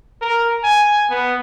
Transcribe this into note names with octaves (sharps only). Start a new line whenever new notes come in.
A#4
G#5
B3